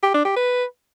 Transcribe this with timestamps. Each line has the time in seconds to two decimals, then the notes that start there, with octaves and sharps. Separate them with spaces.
0.03 G4
0.14 D4
0.25 G4
0.36 B4